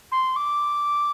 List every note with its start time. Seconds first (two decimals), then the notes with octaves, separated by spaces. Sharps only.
0.11 C6
0.36 D6